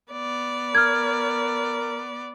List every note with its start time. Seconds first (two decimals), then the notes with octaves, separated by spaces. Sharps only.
0.12 B3 D5
0.75 A#4 F6 G#6